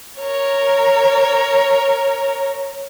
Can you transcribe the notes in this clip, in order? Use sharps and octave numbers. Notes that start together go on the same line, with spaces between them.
A#4 C#5